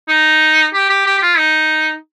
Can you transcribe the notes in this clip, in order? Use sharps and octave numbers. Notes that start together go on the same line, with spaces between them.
D#4
G4
G4
G4
G4
F4
D#4